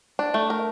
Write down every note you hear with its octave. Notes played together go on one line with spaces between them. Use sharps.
D4
A3
A#4